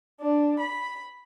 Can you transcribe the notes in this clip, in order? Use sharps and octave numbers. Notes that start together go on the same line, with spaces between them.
D4
B5